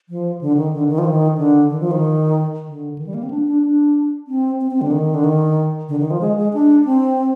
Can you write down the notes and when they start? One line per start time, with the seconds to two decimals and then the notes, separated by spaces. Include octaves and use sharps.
0.09 F3
0.41 D3
0.57 D#3
0.73 D3
0.89 D#3
0.98 F3
1.05 D#3
1.38 D3
1.70 D#3
1.80 F3
1.91 D#3
2.67 D3
2.98 D#3
3.07 G3
3.14 A#3
3.23 C4
3.30 D4
3.47 D4
3.63 D4
4.28 C4
4.60 C4
4.71 C4
4.82 D3
4.92 D#3
5.14 D3
5.24 D#3
5.89 D3
6.00 D#3
6.11 F3
6.21 G#3
6.37 G#3
6.54 D4
6.85 C4